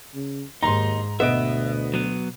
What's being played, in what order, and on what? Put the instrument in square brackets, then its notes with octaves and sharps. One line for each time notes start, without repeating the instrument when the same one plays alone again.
[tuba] C#3
[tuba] D#2 [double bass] G#2 [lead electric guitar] D#4 [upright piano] A#5 C6
[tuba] D2 [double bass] B2 [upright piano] B3 D#5 D7 [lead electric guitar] E5
[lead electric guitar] F#3 B3